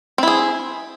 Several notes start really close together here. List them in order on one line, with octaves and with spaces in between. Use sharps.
C4 E4 G#4